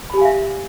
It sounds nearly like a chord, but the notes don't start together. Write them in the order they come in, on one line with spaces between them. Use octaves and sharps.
B5 G4 G#5 F5 E5